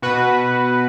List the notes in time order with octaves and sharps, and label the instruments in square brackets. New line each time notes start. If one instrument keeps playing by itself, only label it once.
[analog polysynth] B2 F#4 B4